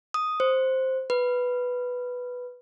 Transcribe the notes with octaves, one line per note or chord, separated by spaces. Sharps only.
D#6
C5
B4